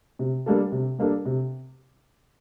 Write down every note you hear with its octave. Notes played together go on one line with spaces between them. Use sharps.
C3
G3 A#3 D4 A4
C3
G3 A#3 D4 A4
C3